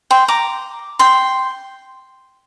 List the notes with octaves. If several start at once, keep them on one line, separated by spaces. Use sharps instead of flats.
G5 C6
A#5 D6
G5 C6